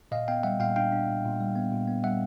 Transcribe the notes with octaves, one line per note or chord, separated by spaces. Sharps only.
A#2 D#5 F5
B3 F5 G5
G3 E5 F#5
A#2 F5 G5
D4 F5 G5
D4
A#2
A#2
G3
B3
A#2
B3
G3 E5 F#5